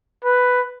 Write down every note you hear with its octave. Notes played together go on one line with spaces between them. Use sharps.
B4